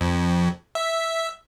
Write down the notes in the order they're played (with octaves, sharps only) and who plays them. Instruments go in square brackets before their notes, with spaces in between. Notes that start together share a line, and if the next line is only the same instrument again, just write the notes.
[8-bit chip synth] F2
E5